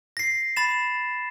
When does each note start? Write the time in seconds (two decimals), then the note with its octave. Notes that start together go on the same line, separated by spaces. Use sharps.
0.17 A#6 C7
0.56 B5 A6 E7